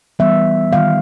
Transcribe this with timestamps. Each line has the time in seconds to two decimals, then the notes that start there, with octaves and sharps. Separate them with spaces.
0.19 E3 G3 B3 E5
0.72 D#3 G3 B3 F5